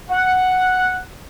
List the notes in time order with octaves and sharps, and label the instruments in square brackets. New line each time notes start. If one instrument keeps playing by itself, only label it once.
[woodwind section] F#5